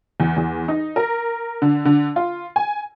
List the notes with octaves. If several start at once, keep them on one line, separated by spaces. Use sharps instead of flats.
E2
E2
D#4
A#4
D3
D3
F4
G#5